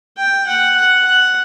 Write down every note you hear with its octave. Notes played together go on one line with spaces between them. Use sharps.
G5
F#5
F#5
F#5